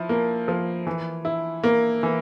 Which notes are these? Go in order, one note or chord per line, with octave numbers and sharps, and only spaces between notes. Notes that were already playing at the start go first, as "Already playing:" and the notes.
Already playing: F3 E4
A#3
F3
E3
E4
A#3
E3